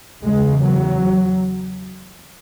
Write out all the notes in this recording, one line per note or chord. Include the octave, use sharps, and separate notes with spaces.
E2 C#3 G#3
F#3